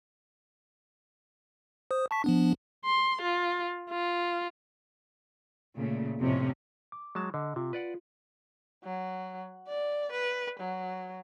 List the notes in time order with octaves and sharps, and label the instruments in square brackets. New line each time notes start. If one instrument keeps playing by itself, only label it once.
[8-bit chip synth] C5 D#6
A5 C#6 B6
F3 B3 D4
[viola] C6
F4
F4
[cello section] A#2 C#3 A3
F2 A2 C3 C#4
[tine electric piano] D6
[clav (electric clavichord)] F#3 G#3 A5
[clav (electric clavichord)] D3 [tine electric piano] D#5
[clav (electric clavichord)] C3 [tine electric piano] F4
[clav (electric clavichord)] B4 D5 F#5
[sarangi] F#3
D5
B4
F#3